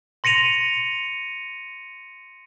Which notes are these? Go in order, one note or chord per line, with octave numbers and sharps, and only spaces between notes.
C6 A#6 C#7 D#7 F7